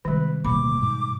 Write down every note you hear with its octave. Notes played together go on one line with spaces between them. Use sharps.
C3 D#3 G3 G#3 B4
D1 B2 G3 A#3 B5 D6
G#2